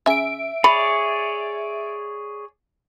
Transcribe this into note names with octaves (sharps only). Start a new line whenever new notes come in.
C#3 E5 G#5 D7
G#4 C#5 D5 B5